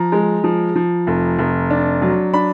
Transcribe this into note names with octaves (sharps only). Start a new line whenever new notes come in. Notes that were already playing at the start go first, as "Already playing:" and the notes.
Already playing: F3 A#5
G#3
F3
F3
F1
F1
D4
F#3
D4 B5